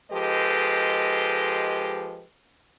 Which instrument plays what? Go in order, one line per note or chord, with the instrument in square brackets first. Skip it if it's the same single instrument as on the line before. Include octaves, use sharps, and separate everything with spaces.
[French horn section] F3 G#3 G4 A4 B4 D#5